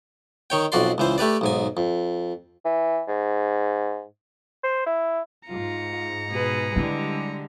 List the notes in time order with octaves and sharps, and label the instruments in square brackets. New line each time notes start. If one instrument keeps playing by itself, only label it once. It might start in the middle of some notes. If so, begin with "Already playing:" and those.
[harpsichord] D#3 C#5 G5
B1 F2 F#4 D5 C6
C#2 E3 C5
A3 G4 B4 D5
B1 G#2 G#5
F2
[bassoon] E3
G#2
C5
E4
[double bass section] G#2 [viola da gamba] F4 [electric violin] A#5 C#7
[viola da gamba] B2 G#4 B4
[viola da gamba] D3 [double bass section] G3 G#3 [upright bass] E4